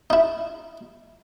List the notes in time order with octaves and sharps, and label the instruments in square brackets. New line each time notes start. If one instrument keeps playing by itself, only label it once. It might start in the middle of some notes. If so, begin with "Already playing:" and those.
[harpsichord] D#4 E4